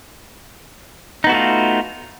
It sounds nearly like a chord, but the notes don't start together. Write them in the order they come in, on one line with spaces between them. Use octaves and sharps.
D#4 B3 F#4 A3 F4